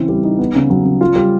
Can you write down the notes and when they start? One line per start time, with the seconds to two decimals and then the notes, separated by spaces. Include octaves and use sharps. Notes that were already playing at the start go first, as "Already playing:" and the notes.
Already playing: C#3 E3 C4
0.09 G3
0.24 D#4
0.39 B3
0.55 C#3
0.70 F#3
0.85 C#3
1.01 F4
1.16 G3